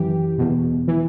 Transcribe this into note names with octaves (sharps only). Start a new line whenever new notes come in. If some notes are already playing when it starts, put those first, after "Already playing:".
Already playing: F#2 E3 G4
E2 B2
E3